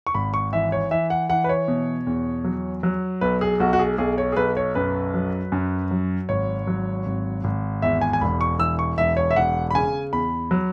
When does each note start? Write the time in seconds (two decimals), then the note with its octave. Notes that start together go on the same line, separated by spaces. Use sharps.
0.07 C#6
0.14 G#1 B5
0.34 C#6
0.53 E3 E5
0.72 C#5
0.91 E3 E5
1.10 F#5
1.30 E3 F#5
1.44 B4
1.49 C#5
1.68 B2
2.07 E2
2.44 F#3
2.83 F#3
3.21 B1 B4
3.41 G#4
3.60 B1 F#4
3.73 F#4
3.79 G#4
3.98 B1 G#4
4.18 C#5
4.32 G#4
4.37 B1 B4
4.57 C#5
4.75 F#2 B4
5.14 F#3
5.52 F#2
5.91 F#3
6.29 G#1 C#5
6.67 F#3
7.06 G#1
7.44 G#1
7.82 E2 E5
8.01 G#5
8.13 G#5
8.21 E1 B5
8.41 C#6
8.59 E3 E6
8.79 C#6
8.98 E1 E5
9.17 C#5
9.31 E5
9.36 E1 F#5
9.71 B5
9.75 C#3 G#5
10.13 E2 B5
10.51 F#3